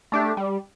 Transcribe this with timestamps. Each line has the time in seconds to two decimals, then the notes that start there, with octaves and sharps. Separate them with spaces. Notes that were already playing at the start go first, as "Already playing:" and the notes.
0.12 A3 D4 G4
0.37 G3